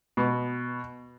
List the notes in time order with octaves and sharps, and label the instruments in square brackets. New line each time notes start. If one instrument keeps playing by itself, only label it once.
[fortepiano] B2